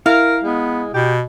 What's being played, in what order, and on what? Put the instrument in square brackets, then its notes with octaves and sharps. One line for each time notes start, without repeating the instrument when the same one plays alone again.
[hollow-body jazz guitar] E4 [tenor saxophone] A#4 [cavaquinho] F5
[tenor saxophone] G#3 [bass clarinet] B3
[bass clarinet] B2 [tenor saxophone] G4